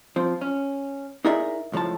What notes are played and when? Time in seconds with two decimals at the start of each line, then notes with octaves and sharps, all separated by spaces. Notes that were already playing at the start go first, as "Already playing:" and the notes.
0.16 F3 C4
0.41 C#4
1.25 D#4 E4 G#4 A#4 D5 E5
1.72 C#2 A2 F3 C#5 A5